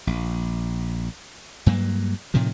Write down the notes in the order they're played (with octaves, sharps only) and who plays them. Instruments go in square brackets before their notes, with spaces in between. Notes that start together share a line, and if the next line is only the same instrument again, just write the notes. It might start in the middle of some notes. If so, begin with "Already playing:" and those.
[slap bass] A#1
G2 F#3 A#3
A2 C3 D#3 F3